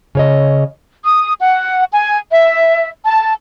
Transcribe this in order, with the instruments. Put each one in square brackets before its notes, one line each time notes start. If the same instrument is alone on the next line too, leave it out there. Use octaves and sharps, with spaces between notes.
[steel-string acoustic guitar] C#3 C#5 D#5
[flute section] D#6
F#5
G#5
E5
A5